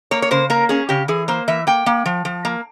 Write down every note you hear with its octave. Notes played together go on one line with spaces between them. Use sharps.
A#3 C#5
C#5
C#3 C5
A#3 A#4
C#4 G#4
C#3 G4
E3 G#4
A#3 C5
E3 E5
A#3 G5
A#3
F3
F3
A#3